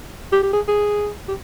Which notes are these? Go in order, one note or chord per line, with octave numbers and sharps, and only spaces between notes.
G4
G4
G#4
G#4
G4